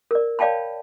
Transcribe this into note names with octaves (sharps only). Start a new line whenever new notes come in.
A#4 D5
C#5 D5 F5 G5 A5 B5